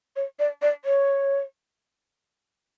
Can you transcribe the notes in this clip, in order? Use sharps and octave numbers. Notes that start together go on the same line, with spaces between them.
C#5
D5
D5
C#5